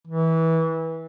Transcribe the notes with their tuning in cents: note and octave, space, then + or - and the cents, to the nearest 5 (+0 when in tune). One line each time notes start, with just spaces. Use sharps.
E3 -25